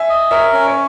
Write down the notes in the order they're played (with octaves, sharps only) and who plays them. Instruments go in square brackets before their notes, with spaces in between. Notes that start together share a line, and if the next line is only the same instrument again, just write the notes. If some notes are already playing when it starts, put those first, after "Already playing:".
Already playing: [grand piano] E5 G#5
[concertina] D#5
[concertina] A#4 [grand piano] C#5 E5
[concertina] C#4
[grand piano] C#5